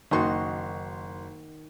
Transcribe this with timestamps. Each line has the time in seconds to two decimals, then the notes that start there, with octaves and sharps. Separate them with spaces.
0.11 F#1 D#3 D#4 F#4 C6